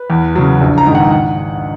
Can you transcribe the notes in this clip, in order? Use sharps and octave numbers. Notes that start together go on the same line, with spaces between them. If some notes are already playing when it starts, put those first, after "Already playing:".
Already playing: B4
E2
C#3 F#3
A#1
A#5
G#2 D#3
F#5
F#5